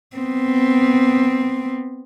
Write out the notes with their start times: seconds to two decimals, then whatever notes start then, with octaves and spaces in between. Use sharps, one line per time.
0.16 B3 C4